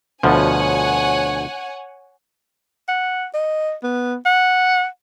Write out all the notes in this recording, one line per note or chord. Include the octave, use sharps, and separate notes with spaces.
D2 B2 F3 C#5 F#5 G#5
F#5
D#5
B3
F#5